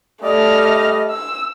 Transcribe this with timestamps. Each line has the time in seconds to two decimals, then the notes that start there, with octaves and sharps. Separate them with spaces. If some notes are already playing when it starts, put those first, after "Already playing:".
0.23 G3 A3 D5 D#5 F6
1.10 E6